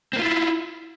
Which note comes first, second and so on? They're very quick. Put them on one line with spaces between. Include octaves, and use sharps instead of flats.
C4 A#3 F4 E4